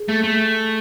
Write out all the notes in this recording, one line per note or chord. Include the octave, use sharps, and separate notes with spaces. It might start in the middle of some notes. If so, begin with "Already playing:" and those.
Already playing: G#4
A3
A3